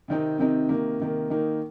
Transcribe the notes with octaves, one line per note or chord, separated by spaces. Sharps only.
C3 D#3 C4 D#4
C3 D#3 C4 D#4
C3 D#3 A#3
C3 D#3 A#3
D#3 A#3 D#4